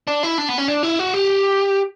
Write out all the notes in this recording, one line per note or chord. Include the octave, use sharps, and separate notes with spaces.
D4
E4
D4
B3
C#4
D4
E4
F#4
G4